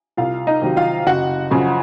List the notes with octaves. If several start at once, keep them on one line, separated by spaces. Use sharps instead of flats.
C2 F4 F5
D#4 D#5
C3 D#3 F#3
F4 F5
F#1 F#4 F#5
F#2 C#3 F3